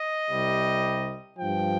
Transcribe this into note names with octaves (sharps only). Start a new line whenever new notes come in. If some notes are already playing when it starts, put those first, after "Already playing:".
Already playing: D#5
C2 C3 G3
G2 F3 G5